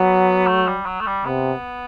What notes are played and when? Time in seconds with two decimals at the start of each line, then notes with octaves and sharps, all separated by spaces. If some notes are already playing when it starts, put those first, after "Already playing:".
Already playing: F#3 B3
0.46 A3
0.67 G3
0.86 F#3
1.00 A3
1.06 G3
1.25 C3 B3